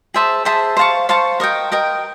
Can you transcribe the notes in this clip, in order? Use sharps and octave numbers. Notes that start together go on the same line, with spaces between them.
G#4 C5 E5 A5
G#4 C5 E5 A5
C5 F5 A5 C#6
C5 F5 A5 C#6
A#4 D#5 G5
A#4 D#5 G5